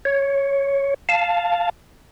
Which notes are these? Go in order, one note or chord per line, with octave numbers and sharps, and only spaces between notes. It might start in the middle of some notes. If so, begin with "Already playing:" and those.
C#5
F5 A5